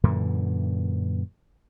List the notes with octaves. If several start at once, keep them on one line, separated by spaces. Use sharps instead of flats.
F#2 A#2 D3 E3